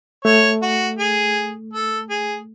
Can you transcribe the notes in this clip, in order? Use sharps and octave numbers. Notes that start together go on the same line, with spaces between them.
A3 C#5
F#4
G#4
A4
G#4